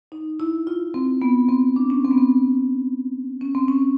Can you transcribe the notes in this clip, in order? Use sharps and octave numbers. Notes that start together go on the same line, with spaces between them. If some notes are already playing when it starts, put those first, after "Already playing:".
D#4
E4
F4
C4
B3
C4
D4
C#4
C4
B3
C4
C#4
C4
C#4